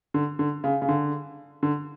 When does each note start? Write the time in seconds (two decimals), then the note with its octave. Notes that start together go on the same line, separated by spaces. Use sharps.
0.14 D3
0.39 D3
0.64 C#3
0.82 C#3
0.89 D3
1.63 D3